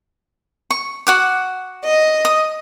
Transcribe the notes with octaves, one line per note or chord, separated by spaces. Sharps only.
C#6
F#4 F#5 D6
D#5
D#6